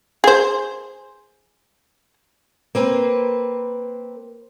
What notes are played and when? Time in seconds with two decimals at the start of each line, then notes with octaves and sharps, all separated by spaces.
0.24 G#4 C5
2.75 A#3 C4 B4